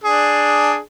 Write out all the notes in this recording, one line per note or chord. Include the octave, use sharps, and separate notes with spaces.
D4 G#4